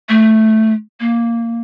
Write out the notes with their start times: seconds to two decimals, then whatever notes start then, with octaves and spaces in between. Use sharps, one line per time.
0.09 A3
1.00 A#3